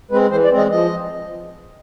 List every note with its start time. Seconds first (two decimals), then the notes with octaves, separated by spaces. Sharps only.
0.11 G#3 C4 B4
0.31 E3 C5
0.44 D5
0.51 G#3 C4
0.58 D#5
0.71 F3 D#5